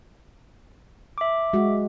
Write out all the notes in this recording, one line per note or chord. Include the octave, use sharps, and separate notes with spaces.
E5 D6
G#3 F#4